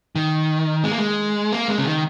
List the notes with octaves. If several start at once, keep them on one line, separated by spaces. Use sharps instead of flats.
D#3
G#3
A#3
G#3
A#3
G#3
C#3
D#3